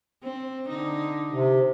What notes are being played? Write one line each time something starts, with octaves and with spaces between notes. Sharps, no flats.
C4
D3 D#4
C3